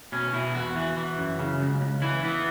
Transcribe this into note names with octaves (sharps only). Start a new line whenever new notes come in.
B2 C#4
B2 E4
E2 F#4
E3
E3
F#2
C#3
C#2
C#2
E3 E4
E3 B3